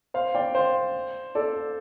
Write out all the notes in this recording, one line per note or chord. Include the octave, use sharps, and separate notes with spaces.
C5 F5
D5 G5
C5 F5
A4 D5